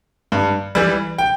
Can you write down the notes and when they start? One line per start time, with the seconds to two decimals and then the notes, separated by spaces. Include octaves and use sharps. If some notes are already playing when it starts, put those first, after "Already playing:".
0.32 G2
0.75 E3 G3
1.18 G5